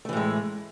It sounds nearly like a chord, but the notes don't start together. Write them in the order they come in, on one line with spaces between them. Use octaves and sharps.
A3 E3 A2 G#3